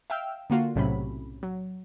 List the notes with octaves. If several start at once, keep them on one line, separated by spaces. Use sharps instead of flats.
E5 F5 G5 E6 F6
D3 A#3 F4 F#4
B1 A2 C3 F#3 C#4 B5
F#3